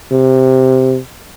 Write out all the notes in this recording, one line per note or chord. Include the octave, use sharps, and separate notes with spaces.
C3